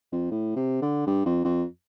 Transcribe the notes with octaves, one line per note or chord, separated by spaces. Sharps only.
F2
A2
C3
D3
G2
F2
F2